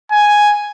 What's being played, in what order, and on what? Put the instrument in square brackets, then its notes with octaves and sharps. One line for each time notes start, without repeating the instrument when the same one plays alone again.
[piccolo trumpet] G#5